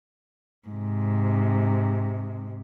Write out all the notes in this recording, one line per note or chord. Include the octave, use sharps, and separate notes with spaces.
G#2 C3